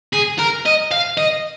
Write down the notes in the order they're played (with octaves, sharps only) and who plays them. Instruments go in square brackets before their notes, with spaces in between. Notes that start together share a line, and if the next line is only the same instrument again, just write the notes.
[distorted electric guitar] G#4
A#4
D#5
F5
D#5